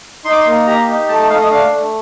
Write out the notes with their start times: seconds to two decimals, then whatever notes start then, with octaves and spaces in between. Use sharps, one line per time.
0.25 D#4 C6
0.32 D6
0.40 C6
0.46 A#3
0.67 G4 A#5
0.88 D#4
1.08 A3 A5
1.19 A5
1.29 A3 F5
1.40 D#5
1.51 D4 F5
1.72 A3